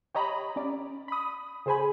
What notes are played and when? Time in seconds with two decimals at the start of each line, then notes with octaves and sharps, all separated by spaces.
0.15 G4 C#5 D#5 A#5 B5
0.56 C#4 D5
1.08 B5 D#6
1.66 C#3 G#4 C5 G#5 B5